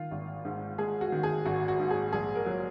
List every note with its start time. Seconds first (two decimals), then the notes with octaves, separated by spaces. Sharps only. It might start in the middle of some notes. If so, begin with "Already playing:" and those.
Already playing: D#3 F4
0.11 G#1
0.45 G#2
0.78 G#3 G#4
1.01 F#4
1.12 D#3
1.23 G#4
1.45 G#1 F#4
1.68 F#4
1.80 G#2
1.90 G#4
2.13 A#1 G#4
2.35 A#4
2.46 F#3